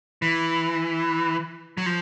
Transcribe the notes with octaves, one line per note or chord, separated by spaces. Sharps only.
E3
F#3
F3